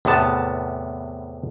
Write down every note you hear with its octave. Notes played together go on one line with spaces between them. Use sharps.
E2 A2 C3 B3 A5